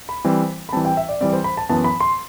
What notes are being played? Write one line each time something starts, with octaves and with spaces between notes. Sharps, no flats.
B5
E3 G3 C4
B5
E3 G3 C4 A5
G5
E5
D5
E3 G3 C4 D5
C5
B5
A5
F#2 E3 B3 A5
B5
C6